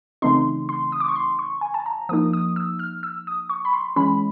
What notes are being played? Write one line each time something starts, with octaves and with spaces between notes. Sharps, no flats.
C#3 E3 A3 C4 D#4 C6
C6
D#6
D6
C#6
C6
C#6
G#5
A5
A#5
F3 A#3 D#4 D#6
D#6
E6
F6
E6
D#6
C#6
B5
C6
E3 G#3 C#4 B5